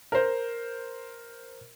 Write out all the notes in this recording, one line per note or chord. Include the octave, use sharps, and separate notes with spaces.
A#4 C5